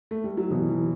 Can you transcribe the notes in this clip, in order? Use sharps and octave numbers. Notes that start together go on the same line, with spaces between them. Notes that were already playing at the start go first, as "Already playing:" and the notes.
A3
G3
F#3
B2 E3 F#3 B3
E3